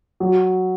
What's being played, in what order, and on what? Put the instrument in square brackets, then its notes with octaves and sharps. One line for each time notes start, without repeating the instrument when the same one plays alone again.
[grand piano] F#3